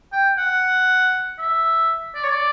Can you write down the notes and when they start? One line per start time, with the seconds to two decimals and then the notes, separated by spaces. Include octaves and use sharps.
0.13 G5
0.38 F#5
1.39 E5
2.15 D5
2.23 C#5
2.31 D5